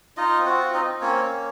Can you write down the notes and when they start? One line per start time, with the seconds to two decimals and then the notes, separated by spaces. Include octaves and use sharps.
0.17 D#4 F4 D#5
0.39 C4
0.45 F#4 F#5
0.60 F4
0.74 D#4 D#5
0.81 C4
1.01 A#3 C#4 C#5
1.23 C#4